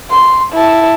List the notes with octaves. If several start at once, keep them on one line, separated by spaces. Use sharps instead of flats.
C6
E4 A5